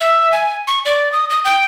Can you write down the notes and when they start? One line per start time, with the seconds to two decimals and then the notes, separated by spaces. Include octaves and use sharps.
0.01 E5
0.32 G#5
0.68 C#6
0.85 D5
1.12 D#6
1.30 D#6
1.45 G5